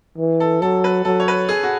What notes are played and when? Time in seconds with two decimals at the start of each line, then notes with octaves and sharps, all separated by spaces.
0.18 E3
0.40 A4
0.61 F#3 A4
0.84 B4
1.05 F#3 A4
1.20 C#5
1.28 B4
1.49 G#4
1.63 F#4